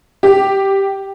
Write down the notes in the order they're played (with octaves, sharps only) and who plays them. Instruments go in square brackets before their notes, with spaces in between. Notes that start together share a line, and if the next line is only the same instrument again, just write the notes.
[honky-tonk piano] G4